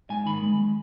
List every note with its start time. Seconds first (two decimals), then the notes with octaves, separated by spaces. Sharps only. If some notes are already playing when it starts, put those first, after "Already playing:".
0.10 G#2 G#5
0.26 D#3 B5
0.42 G#3
0.59 G#3